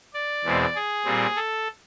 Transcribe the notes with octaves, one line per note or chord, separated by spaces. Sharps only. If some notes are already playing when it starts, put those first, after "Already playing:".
D5
E2 B2 G#3 C4
G#4
A#2 G3 C4
A4